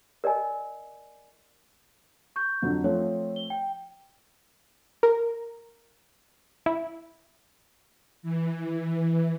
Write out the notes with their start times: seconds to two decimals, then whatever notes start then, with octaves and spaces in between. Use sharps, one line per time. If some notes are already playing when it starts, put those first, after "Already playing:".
0.24 A#4 D5 D#5 G#5
2.36 C#6 G6
2.62 F2 D3 F#3
2.84 F3 A3 C4 C#5
3.36 G7
3.50 G5
5.03 A#4
6.66 E4
8.23 E3